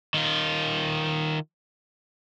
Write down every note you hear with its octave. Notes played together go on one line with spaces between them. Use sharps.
D#3 F4